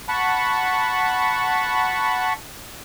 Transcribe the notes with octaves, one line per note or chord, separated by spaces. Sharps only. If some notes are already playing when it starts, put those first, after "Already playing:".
F#5 A5 B5 C#6